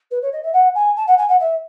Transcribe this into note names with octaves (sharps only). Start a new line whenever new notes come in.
B4
C#5
D#5
E5
F#5
G#5
A5
F#5
G#5
F#5
E5